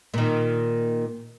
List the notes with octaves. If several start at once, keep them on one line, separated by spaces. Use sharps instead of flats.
A#2 D#3